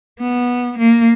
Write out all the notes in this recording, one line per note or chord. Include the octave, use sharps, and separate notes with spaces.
B3
A#3